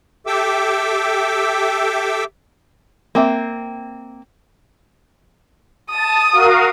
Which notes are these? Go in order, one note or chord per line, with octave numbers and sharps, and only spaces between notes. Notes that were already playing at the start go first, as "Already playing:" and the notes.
G4 A4 E5 G5 D6 E6
A#3 C4 E5
A5 D#6
F#4 A#4 F5